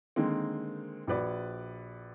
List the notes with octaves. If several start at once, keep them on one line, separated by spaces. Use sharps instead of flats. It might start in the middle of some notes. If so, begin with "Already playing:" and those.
D3 D#3 G#3 A#3 C4
A#1 F#4 B4 D5